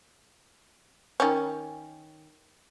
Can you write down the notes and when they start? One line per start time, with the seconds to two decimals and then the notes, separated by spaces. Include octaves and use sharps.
1.20 D#3 C#4